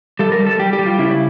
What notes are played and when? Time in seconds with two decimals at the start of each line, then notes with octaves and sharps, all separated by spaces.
0.19 G3 A4
0.32 A#4
0.39 G3
0.46 A4
0.59 G3 G4
0.73 G4
0.79 G3
0.86 F4
0.99 C#3 E4